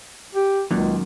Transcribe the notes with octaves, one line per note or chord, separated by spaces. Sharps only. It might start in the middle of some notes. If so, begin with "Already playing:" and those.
G4
C#2 F#2 A#2 D#3